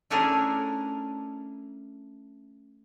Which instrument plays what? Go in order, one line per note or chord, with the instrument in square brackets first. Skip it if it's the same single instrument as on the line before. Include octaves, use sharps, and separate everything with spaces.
[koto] A3 C#4 D4 E4 G#4 A#4